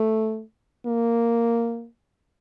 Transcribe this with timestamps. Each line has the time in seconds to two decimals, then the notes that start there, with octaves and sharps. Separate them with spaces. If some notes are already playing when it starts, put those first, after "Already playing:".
Already playing: A3
0.86 A#3